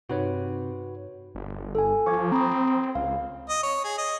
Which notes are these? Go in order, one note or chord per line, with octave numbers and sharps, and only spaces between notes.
G2 C3 D#4 F#4 B4 C#5 B5
G1
A4 G#5
F3 C#6 D6 G#6
C4 A#5 B5 D#6
C#2 F5
D#5
C#5
G#4
D#5